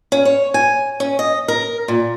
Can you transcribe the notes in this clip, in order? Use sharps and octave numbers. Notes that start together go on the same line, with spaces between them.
C#4
C#5
G#5
C#4
D#5
A#4
A#2